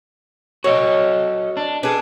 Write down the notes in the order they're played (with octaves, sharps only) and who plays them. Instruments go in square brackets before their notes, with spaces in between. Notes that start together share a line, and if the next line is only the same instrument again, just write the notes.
[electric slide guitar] F#4 A4 D#5 [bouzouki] C#5
[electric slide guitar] D4
[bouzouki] D4 G#4 [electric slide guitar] A4 B4